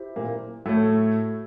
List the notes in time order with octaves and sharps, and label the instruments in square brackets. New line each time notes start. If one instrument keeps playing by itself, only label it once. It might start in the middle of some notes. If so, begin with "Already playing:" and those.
Already playing: [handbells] E4 G4 C5 E5
[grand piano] A#2 A#3
[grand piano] A2 A3 [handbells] F#4 A4 C#5